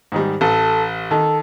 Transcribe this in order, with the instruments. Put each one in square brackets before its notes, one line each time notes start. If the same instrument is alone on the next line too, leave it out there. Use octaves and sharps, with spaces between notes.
[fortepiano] G#2 D#3 G3
[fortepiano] A1 [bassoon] A4
[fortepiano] D#3 [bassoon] A4